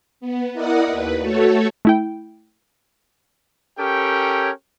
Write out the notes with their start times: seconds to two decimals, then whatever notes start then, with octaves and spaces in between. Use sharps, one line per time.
0.21 B3
0.53 E4 A#4 D5 D#5 F#5 D#6
0.87 D#2 B4
1.20 A3 F#4 A4 C#5
1.85 A3 E4 G5
3.78 C#4 G4 A4 A#4 C#5 G5